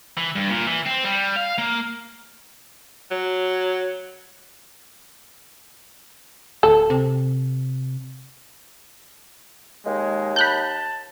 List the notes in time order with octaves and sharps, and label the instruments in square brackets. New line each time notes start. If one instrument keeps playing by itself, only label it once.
[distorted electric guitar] E3
G2
A#2
E3
C4
G3
F5
A#3
[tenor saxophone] F#3
[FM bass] D1 [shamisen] A4
[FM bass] C3
[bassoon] D#2 [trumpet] G#3
[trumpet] A5 [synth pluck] B5 F#6 G6